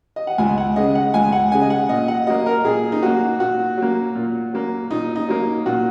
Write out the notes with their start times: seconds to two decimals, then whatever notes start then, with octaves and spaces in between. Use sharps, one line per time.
0.16 D#5
0.27 F#5
0.38 C#2 G#5
0.58 F#5
0.76 C#3 G#3 D#5
0.95 F#5
1.14 C#2 G#5
1.32 F#5
1.52 C#3 G#3 G#5
1.61 D#5
1.70 F#5
1.89 A#2 D#5
2.08 F#5
2.27 F#3 A#3 D#5
2.46 A#4
2.64 A#2 G#4
2.92 D#4
3.02 F#3 A#3 F#4
3.40 A#2 F#4
3.77 F#3 A#3
4.15 A#2
4.53 F#3 A#3
4.90 A#2 D#4
5.16 D#4
5.28 F#3 A#3
5.66 A#2 F#4